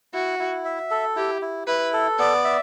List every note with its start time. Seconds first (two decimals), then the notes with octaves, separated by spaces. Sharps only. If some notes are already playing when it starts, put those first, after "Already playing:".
0.13 E4 F#4
0.39 E4
0.65 E5
0.91 A4
1.16 E4 G4
1.42 E4
1.67 E4 B4
1.93 A4
2.19 B3 D5
2.44 E5